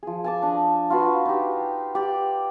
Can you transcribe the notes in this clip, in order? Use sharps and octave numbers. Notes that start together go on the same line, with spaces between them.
F3 G#4
G#5 A5 D6
D4 D#5
F4 F#4 B4
D#4 G4
G4 D5